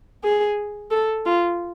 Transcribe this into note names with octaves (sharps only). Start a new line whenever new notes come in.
G#4
A4
F4